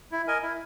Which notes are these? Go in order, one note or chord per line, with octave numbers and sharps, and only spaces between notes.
E4
A#4 D#5 G#5
E4